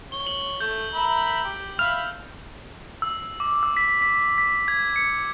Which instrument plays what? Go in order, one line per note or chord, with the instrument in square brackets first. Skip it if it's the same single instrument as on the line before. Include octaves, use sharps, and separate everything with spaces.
[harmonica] C#5 [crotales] G7
[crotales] F#7
[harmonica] A3 [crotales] G6
[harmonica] A#4 E5 B5
G4
[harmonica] E5 F5 B5 [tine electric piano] F6
[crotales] E6
D6
E6
B6
B6
B6
G#6
C#7
C#7